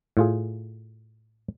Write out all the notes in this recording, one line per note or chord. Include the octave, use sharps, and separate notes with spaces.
A2 F4 G#4